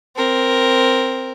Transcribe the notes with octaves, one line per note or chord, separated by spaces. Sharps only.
C4 A#4